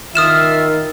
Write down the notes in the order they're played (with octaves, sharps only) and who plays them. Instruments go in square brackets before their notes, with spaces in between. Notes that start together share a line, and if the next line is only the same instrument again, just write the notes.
[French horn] D#3 [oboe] F4 [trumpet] E5 [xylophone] D#6 F6 E7